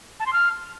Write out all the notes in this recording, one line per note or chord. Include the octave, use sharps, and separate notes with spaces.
A5
C6
F6